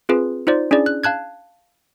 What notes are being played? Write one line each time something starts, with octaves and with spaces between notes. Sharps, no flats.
C4 F4 G#4 B4
D#4 F4 C5 D5
C#4 D4 E4 G#4 D5
F#6
F5 A5 F#6 G#6